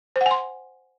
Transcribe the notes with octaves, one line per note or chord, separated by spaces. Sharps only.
C5
F#5
G#5
C6